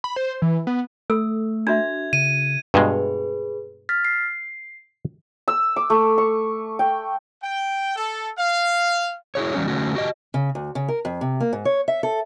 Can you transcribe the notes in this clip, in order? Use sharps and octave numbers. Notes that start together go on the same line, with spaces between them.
B5
C5
E3
B3
A3 A4 E6
D4 F#4 E5 G#6
C#3 D#7
G2 B2 G#3 G#4 B4
F6 A6 B6
C7
E6
D6
A3
C#6
G5
G5
A4
F5
E4 F#4 G#4 C#5
E3 F#3 G3 C#4
D3 A3 C#4 F#4
F#4 G4 D#5
C#3
D2
C#3
A#4
F2
C3
A#3
G#2
C#5
E5
A4